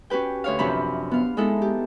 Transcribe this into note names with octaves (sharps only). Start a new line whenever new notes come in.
C#4 F#4 G4 B4 G5
D2 C#5 F5
F#2 C3 F3 D4 B5
B3 F5
G#3 B3 D#4 E4 A4
G4